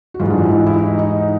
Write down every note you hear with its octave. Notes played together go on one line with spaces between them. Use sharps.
F#4
G#2 E3 G3 F4
D4
D#4
E4
E4
D#4
D#4